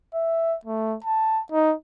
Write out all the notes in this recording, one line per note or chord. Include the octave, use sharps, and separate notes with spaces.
E5
A3
A5
D#4